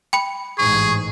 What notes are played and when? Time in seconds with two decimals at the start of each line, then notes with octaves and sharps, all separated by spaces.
0.13 G5 B5 C#7
0.58 A1 G#2 G#4 C#6